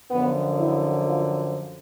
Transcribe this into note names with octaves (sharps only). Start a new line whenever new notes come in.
F#2 D3 F3 B3
E4
F4